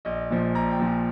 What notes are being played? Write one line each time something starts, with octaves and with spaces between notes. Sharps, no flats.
A#1 D#5
A#2 F3
A#1 A#5
G5
A#2 F3